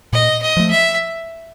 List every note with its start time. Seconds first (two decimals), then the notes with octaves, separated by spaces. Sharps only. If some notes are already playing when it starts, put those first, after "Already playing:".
0.13 A#2 D#5
0.42 D#5
0.57 F3 A3
0.71 E5